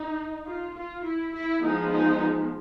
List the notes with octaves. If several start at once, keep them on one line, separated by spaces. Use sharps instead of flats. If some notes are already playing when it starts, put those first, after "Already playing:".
Already playing: D#4
F4
F4
E4
E4
F3 G#3 B3 D#4
D#4